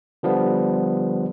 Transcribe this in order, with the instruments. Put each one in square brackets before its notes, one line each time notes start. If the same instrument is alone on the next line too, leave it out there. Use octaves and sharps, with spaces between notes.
[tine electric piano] D3 F3 G3 B3